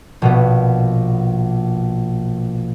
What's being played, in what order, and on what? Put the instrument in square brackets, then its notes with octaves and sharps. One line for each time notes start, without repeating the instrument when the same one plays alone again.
[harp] A#1 B2 B3